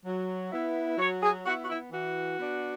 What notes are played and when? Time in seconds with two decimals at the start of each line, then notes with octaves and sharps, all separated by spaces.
0.05 F#3
0.52 B3 E4
0.98 F#3 C#5
1.21 G#4
1.45 B3 F#4
1.48 E4
1.64 F#4
1.68 E4
1.92 E3 F#4
2.39 B3 D4